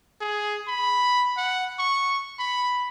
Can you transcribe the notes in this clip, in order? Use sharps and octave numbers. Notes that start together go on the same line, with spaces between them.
G#4
B5
F#5
C#6
B5